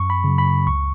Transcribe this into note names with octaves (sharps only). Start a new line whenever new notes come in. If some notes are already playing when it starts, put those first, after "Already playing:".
Already playing: F#2 C#6
B5
C#3 F#3
B5
C#2 C#6